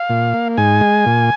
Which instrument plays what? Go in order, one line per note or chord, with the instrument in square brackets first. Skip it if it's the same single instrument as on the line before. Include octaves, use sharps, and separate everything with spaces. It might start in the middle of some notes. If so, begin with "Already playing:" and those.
Already playing: [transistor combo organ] F5
A#2
A#3
G#2 G#5
G#3
A#2